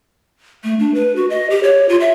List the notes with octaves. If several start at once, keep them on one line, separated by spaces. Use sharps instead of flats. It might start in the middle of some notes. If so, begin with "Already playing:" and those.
A3
D4
B4
F#4
D#5
G4
C#5
F4
E5